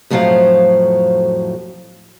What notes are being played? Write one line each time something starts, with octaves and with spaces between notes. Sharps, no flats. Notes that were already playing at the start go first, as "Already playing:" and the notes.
F2 A2 F3 F#3 C5 F5